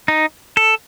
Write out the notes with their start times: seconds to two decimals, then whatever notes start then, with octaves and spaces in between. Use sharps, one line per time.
0.08 D#4
0.57 A4